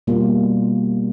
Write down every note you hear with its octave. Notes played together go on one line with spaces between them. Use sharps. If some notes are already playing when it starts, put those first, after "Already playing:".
B2 G3 A#3 F4